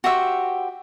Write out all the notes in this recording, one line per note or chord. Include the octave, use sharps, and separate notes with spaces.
F#4 G4 C5 E5